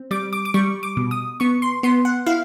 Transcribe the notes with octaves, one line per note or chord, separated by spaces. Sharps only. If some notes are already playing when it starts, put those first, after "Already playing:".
Already playing: C4
G3 D6
D6
D6
G3 C#6
D6
B2
D#6
B3 C#6
C6
B3 C6
F#5
E4 F5